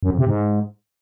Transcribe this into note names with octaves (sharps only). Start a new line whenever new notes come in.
F#2
F2
C3
G#2